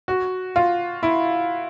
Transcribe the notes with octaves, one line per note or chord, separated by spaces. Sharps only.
F#4
F4
E4